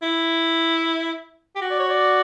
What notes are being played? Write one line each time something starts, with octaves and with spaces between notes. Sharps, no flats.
E4
G4
F#4
D5
C#5
D5